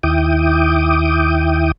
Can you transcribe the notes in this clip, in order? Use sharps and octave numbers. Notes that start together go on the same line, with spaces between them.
D#2 E4 G5 D6 D#6